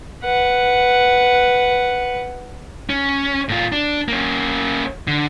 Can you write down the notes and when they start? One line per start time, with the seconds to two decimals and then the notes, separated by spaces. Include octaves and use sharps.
0.24 B4 F#5
2.90 C#4
3.49 A2 F4
3.72 D4
4.08 A#3 C#4
5.07 D3